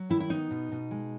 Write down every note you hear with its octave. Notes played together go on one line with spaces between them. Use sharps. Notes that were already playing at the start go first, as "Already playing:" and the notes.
Already playing: F#3
D#3 E4
E4
B3 D#4
B2
B2
G#3